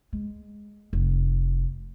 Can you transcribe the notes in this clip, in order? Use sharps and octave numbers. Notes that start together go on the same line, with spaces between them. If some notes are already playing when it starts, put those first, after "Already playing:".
G#3
F1